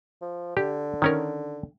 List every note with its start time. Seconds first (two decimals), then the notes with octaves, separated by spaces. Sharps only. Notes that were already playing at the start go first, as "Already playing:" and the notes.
0.22 F3
0.57 D3 G4
1.02 D#3 C#4 A#4